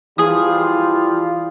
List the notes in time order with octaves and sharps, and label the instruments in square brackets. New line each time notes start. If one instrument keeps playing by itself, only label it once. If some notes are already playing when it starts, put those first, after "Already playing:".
[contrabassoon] E3 [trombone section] F3 G3 F4 [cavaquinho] G#4 D#6